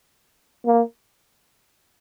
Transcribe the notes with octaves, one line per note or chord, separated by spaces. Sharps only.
A#3